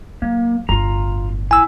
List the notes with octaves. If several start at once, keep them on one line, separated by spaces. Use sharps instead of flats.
F#3 A#3
G1 A2 F4 A#5
E4 G#5 E6